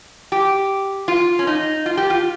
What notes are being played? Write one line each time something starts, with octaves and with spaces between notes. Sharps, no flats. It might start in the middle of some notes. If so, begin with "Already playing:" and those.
G4
F4
C#4
D#4
F4
G4
F4